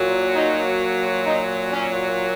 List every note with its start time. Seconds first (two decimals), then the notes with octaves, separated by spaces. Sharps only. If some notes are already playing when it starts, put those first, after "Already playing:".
Already playing: A#2 F#3
0.35 D#4
1.26 D#4
1.72 C#4